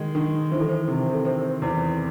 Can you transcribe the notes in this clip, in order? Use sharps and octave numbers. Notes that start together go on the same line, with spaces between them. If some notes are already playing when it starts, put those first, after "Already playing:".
Already playing: D#3 G#3
D#3
E3 C5
A4
C5
C3
A4
C4 C5
E2